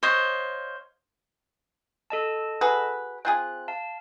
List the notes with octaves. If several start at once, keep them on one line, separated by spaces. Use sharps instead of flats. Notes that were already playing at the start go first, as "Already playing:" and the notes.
C5 C#5 D#5 F5
A4 D#5 A5
F#4 G#4 B4
C4 F4 G#4 F#6
F5 A5